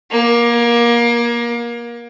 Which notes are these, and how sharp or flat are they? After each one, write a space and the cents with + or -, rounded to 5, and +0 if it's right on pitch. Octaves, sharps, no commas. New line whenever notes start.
A#3 +25